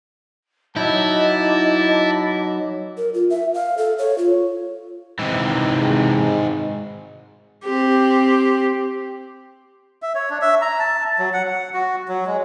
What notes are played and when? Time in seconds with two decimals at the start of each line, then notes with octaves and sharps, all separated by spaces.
0.77 F#3 D#4 E4 D#5 A5 D6
2.98 A#4
3.14 F4
3.30 E5
3.54 F5
3.78 A4
3.98 C#5
4.18 F4
5.19 G#2 C3 D#3 E3
5.80 G#3
7.64 C4 G4
10.02 E5
10.15 C#5
10.30 D4
10.41 E5
10.61 A#5
10.79 A5
11.19 F#3
11.33 F#5
11.47 F#5
11.74 F#4
12.08 F#3
12.27 G#3